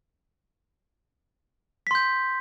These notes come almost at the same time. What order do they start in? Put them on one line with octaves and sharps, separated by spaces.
B6 C6 G6